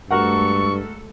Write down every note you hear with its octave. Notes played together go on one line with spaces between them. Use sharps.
G2 G#3 A3 F#4 A4 A#4 F#5 C#6